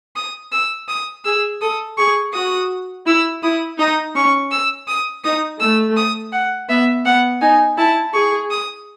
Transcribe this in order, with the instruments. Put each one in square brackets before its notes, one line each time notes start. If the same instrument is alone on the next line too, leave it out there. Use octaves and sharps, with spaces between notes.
[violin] D#6
E6
D#6
[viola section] G#4 [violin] E6
[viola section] A4 [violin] D#6
[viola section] G#4 [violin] C#6
[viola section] F#4 [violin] D#6
[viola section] E4 [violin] E6
[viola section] E4 [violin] D#6
[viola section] D#4 [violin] D#6
[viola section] C#4 [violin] C#6
[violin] E6
D#6
[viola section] D#4 [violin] D#6
[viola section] A3 [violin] E6
[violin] D#6
F#5
[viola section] B3 [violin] E5
[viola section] B3 [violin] F#5
[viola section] D#4 [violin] G#5
[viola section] E4 [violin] A5
[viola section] G#4 [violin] C#6
[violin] D#6